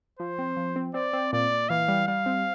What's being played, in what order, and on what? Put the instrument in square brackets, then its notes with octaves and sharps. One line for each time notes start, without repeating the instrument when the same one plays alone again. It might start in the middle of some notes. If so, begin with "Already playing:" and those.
[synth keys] F3 [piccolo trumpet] C5
[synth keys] C4
F3
C4
[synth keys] C4 [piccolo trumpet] D5
[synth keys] C4
[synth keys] A#2 [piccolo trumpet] D5
[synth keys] A#2
[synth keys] E3 [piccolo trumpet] F5
[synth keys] G3
[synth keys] G3 [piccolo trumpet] F5
[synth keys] C4